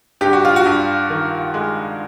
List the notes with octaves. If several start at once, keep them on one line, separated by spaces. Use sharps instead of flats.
G2 G4
F#4
F4
F#4
G2
D#3
G#3